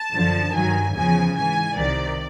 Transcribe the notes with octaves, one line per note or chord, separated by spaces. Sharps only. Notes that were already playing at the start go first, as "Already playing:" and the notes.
Already playing: A5
F#2 D3 F3
G2 D#3 F#3 G#5
E2 C#3 F3 G#5
G#2 E3 G#5
C2 C3 D#3 D5